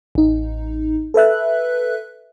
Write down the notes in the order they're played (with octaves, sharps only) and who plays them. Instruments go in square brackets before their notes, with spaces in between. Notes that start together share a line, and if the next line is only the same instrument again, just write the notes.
[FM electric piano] A1 D#4
A4 B4 E5 F#6